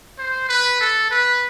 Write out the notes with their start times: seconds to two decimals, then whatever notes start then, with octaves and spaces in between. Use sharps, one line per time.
0.18 C5
0.49 B4
0.81 A4
1.11 B4